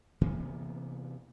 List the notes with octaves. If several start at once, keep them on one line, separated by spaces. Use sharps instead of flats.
C3 E3 A#3 B3